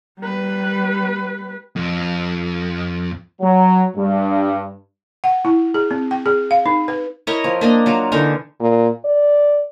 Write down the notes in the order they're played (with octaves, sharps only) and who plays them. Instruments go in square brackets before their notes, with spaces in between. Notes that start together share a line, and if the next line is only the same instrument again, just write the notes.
[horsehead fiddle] G3 B4
[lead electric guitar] F2
[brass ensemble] F#3
G2
[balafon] F#5
E4
G#4
C4
G5
G#4
F5
D#4
B4
[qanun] E4 A#4 C#5 D#5
F3
A#3 D4 D#5
F#3 F4
D3 E3 D#4 A#4
[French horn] A#2
D5